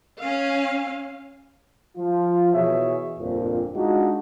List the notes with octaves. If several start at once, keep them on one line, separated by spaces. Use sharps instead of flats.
C#4 F5
F3 F4
B2 E3 G#4 C#5 E5
G1 F2 A#2
G#3 D4 D#4 F4 F#4